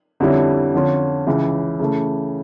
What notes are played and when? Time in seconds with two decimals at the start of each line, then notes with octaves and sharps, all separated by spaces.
0.20 F2 D3 G3 C#4 E4
0.74 F2 D3 F3 C#4 F4
1.27 C#2 C#3 E3
1.79 C#3 E3 A3